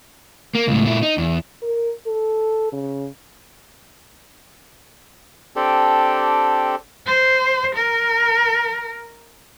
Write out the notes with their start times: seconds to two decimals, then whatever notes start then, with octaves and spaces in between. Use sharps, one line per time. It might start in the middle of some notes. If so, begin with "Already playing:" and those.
0.55 A#3
0.68 C#2 A2
0.85 A#2 E4
1.03 D#4
1.18 E2
1.62 A#4
2.07 A4
2.73 C#3
5.56 C4 D4 G4 A4
7.06 C5
7.75 A#4